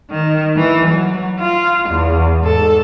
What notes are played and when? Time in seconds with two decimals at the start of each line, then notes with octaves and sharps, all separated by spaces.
0.10 D#3
0.56 E3
0.88 F#3
1.40 F4
1.89 E2
2.41 G#2 A4